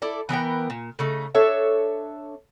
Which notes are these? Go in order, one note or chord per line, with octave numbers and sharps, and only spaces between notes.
E4 A4 D5
E3 B3 A#4 G5
A#2
C#3 A3 D#4
D4 A4 C#5 E5